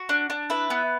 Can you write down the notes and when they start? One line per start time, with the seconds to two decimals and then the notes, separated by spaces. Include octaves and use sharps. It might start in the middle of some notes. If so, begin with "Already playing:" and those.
Already playing: F#4
0.09 D4
0.30 D4
0.50 E4 B4
0.70 B3